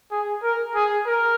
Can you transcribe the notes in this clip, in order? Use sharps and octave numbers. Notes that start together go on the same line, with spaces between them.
G#4
A#4
G#4
A#4